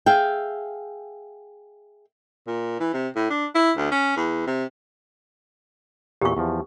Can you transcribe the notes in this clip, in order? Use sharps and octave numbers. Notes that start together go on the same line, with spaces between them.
G#4 E5 F5 G5
A#2
E3
C3
A2
D4
E4
D2
C#4
E2
C3
E2 A#2 G4 C#6
E2 F3